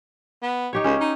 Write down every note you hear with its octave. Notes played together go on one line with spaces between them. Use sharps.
B3
D#4 G4 C#5
C#2 C#4
D#4